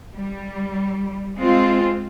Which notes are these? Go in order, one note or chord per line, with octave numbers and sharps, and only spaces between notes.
G3
G#3 C4 F4